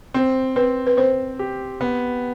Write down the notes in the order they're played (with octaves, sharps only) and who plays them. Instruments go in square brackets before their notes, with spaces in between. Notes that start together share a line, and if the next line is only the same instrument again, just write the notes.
[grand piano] C4 [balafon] C5
[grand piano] C4 [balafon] B4
[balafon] B4
[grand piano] C4 [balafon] C5
[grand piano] G4
B3